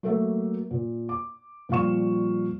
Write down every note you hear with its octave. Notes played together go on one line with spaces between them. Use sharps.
F#3 A3 A#3 A4 E5
A#2
D6
A#2 F3 G3 F5 C#6 E7